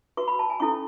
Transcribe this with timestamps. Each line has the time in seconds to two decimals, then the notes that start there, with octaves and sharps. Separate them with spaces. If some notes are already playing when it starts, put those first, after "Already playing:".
0.17 F#4 B4 C#6
0.28 B5
0.39 A5
0.50 G#5
0.60 C#4 E4 A4 C#6